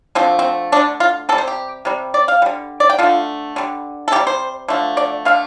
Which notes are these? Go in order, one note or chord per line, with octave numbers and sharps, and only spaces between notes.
D3 F3 A3 C4
C4
D3 A3 D4
F4
C3 G3 A4
C5
G4
C3 G3
D5
F5
D3 G3
D5
G5
D3 A3 F4
D3 G3
A4
C3 G3 G4
C5
D3 F3 A3
D5
D3 A3 F5